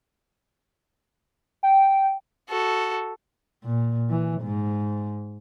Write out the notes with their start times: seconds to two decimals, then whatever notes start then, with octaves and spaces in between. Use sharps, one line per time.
1.63 G5
2.50 F#4 A4
3.64 A#2
4.09 E3
4.42 G#2